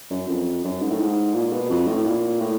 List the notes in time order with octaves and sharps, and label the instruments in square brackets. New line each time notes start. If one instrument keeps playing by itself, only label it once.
[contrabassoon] F#2
F2
F#2
G#2
A2
G#2
A#2
B2
F2
A2
A#2
A2